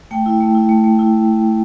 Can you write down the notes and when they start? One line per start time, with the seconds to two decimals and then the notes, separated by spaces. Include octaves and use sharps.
0.11 A3 G5
0.26 E4
0.41 A3
0.55 E4
0.69 A3
0.84 A3
0.99 E4